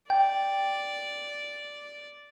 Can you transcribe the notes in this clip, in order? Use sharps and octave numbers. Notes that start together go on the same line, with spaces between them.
D5 G5